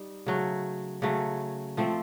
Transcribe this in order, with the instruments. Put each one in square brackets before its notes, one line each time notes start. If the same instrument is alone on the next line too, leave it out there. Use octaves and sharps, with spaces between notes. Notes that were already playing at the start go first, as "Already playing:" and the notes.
Already playing: [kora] G3 D#4
C#3 F#3 A3
C#3 F#3 A3
F3 A3 C4